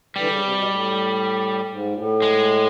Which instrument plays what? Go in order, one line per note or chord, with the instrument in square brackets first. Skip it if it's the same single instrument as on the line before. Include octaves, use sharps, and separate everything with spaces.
[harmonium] D3 E3 [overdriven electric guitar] G3
[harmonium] C#3
C3
B2
A2
G#2
A#2
A2
[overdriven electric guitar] G#3